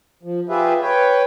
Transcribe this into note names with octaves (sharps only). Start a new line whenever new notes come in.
F3
F4 G4 G#4 B4 E5
B4 C#5 G5